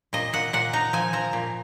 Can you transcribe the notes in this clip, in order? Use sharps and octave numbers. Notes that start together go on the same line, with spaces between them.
A#2 D#5
A#2 F#5
A#2 F#5
D#4 A#5
F3 G#5
F3 A#5
A#2